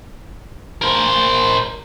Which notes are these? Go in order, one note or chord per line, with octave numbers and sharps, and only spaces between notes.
A#4 C5